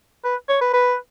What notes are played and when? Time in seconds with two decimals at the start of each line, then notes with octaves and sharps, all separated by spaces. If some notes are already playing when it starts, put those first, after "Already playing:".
0.24 B4
0.49 C#5
0.61 B4
0.73 B4